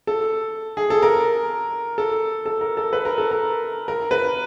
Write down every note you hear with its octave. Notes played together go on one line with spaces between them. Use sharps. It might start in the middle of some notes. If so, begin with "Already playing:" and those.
A4
G#4
A4
A#4
A4
A4
A#4
A4
B4
A#4
A4
A#4
A#4
B4